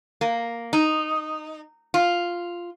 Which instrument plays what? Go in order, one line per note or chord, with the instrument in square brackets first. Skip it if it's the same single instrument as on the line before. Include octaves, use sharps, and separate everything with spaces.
[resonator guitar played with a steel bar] A#3
D#4
F4